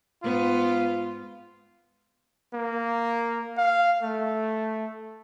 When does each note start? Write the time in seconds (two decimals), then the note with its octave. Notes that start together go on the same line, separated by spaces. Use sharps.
0.23 G#2 B3 F4
2.54 A#3
3.58 F5
4.02 A3